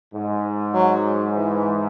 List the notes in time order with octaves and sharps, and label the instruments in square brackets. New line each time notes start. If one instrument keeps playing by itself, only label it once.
[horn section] G#2
[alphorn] F#3
E3